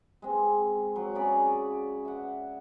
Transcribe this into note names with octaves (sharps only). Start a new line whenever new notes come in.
G#3 C4
F#3 A#5
C#3 G#4 D5 B5
E5 F#5